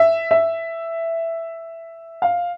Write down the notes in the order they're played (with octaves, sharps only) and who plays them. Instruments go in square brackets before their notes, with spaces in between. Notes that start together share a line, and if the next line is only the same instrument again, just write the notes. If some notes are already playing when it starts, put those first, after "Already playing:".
Already playing: [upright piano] E5
E5
F5